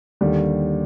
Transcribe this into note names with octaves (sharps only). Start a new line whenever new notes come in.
D#2 D3 G3